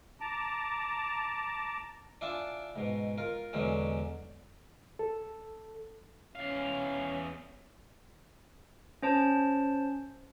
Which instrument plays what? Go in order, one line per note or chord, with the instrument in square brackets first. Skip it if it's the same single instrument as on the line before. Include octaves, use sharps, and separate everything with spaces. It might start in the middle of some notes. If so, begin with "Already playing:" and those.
[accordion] A5 A#5 D6
[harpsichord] D4 E4 F4 D5 G#5 A5
G#2 B2
F4 A#4
E2 B2 D3 F#3 G#3 C#4
[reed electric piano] A4
[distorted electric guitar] E2 F5 [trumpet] C#4
[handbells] C#4 C5 A5